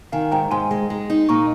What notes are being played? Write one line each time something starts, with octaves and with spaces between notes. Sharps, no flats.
D#3 F5 G#5
G#2 G5 A#5
G#2 G#5 C6
G#3
G#3
D#4
A#2 A#5 C#6